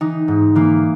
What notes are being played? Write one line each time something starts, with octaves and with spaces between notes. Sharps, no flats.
E3 D#4
G#2
E3 A#3